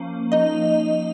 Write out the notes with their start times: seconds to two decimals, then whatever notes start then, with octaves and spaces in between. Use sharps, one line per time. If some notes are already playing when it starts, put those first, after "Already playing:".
Already playing: F3 A#3 C#4
0.32 D#4 D#5